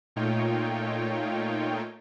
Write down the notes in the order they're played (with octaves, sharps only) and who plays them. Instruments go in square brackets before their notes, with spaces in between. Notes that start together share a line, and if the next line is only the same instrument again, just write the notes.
[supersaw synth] A#2 A3 D#4 F4 C#5 G5